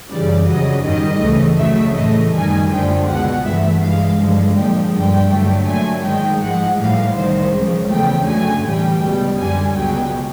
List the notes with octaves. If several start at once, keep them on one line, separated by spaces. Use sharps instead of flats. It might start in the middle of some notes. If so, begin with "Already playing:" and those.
F#2 C#3 E3 G3 D5
F2 C#3 F#3 D#5
G#2 D#3 G3 D#5
C#2 C#3 E3 A3
F2 C#3 F#3 A3 E5
A2 E3 A3 D#5
F#2 D#3 G3 G#5
F#2 D3 F3 A3 G5
C#2 B2 G#3 F#5
G2 E3 A3 E5
G2 E3 G#3 F5
G2 D3 F3 G#3
A#2 F3 G#3 G5
G2 D3 G3 G5
G2 D3 F#3 A3
A#2 F#3 A3 G#5
G#2 D#3 G#3 G5
G#2 F3 G#3 F#5
A2 E3 G3 F5
C2 C3 D#3 C5
C#2 C#3 F3
E2 C#3 F3 A3 G5
F#2 D3 F#3 A3 G#5
A2 E3 G3 G5
C#2 B2 G3
F#2 D3 G3 G#5
C#2 B2 F#3 G5